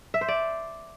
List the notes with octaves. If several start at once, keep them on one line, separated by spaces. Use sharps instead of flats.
E5
C5
D5